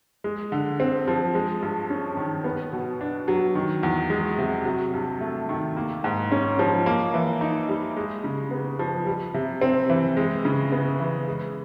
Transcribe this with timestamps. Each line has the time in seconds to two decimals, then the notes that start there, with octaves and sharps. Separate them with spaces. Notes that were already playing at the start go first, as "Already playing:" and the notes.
0.24 G#3
0.52 D3
0.80 C4
1.08 F3
1.35 G#3
1.62 G2
1.90 C#4
2.17 D#3
2.44 B3
2.73 B2
3.01 D4
3.28 F#3
3.55 D#3
3.83 E2
4.10 G#3
4.39 C3
4.66 F#3
4.94 G2
5.21 A3
5.49 D#3
5.77 A#3
6.04 G#2
6.32 C#4
6.59 F3
6.86 A#3
7.14 E3
7.41 D#4
7.69 G3
7.97 G#3
8.24 C#3
8.51 B3
8.79 F3
9.06 G3
9.34 C3
9.61 C4
9.90 E3
10.17 G#3
10.45 C#3
10.72 B3
11.00 E3
11.28 G#3